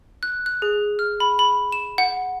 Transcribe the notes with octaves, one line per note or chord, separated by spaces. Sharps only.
F#6
F#6
G#4
F6
B5
B5
E7
F#5